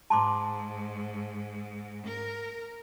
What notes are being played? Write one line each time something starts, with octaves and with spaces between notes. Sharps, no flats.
G#2 A5 C6 D6
A#4